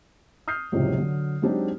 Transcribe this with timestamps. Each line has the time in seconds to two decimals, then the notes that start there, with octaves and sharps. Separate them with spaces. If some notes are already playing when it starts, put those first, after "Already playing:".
0.48 D#6 F6 G6 C7
0.72 F#1 C#2 A2 C3 F3 F#3
0.98 D3 F#3
1.42 F#3 G#3 C4 D4 D#4 G4